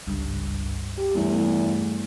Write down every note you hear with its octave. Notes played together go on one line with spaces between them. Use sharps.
G#1 C#2 G2
G4
E2 G2 G3 A3